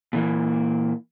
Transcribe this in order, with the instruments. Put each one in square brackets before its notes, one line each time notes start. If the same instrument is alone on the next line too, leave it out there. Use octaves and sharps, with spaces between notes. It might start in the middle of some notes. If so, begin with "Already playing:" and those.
[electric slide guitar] A#2 E3 A#3